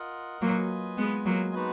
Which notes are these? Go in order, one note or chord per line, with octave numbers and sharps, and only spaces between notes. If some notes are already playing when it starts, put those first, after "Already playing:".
Already playing: F4 A#4 D#5 F#5
F#3 A#3 F4 B4 D#5 G#5
G#3 B3
F#3 A#3
G#3 B3 D#4 F#4 B4